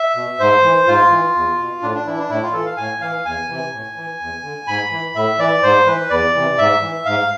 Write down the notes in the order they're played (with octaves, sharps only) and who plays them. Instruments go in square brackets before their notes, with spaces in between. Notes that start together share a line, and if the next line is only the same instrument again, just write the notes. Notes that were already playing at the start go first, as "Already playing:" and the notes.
Already playing: [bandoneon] E5
B2
G#2 C5
E3
G#2 F4
E3
E2
B2
A2 D4
D4
E3 E4
D4
A2 E4
F4
E3 A4
F5
A2 G#5
E3 F5
E2 G#5
C3 E3
A2
E3
E2
D3
G#2 B5
E3
A2 E5
E3 D5
G#2 C5
E3 B4
E2 D5
C3 E3
G#2 E5
E3
G#2 F5